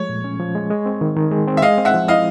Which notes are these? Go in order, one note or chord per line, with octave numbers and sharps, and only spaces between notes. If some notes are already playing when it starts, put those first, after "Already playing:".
Already playing: F3 G#3 A3 C#5
A#2
C#4
F3
G#3
G#3
C4
D#3
D#3
G#3
C4
E5
G#3 D#5 F5
C4
E5 F#5
F3
E4 D#5 F5